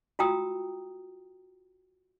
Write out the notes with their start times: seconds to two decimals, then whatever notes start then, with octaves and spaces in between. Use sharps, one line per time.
0.19 F4 F#4 G5 A#5 D#6 E6